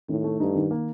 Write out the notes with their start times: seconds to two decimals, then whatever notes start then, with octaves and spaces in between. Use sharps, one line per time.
0.09 A2 D#3
0.24 A3
0.40 G2 D#4
0.55 D#3
0.71 A#3